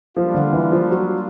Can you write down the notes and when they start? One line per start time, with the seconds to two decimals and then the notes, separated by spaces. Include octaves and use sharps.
0.16 F3 G3 A#3 D4 F4
0.34 D3
0.53 E3
0.72 F3
0.90 F#3